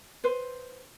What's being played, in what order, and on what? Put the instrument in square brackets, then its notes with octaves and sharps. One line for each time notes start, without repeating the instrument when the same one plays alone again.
[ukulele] B4 C5